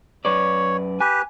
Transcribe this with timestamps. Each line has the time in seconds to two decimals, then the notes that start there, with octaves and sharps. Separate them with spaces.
0.25 F#2 B4 C#5 D5
1.00 G4 B4 G#5